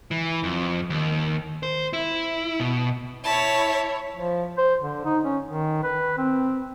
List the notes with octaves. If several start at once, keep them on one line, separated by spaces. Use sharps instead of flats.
E3
F2
D#2
C5
E4
B2
E4 C#5 A5 B6
F3
C5
D3
D#4
C#4
D#3
B4
C4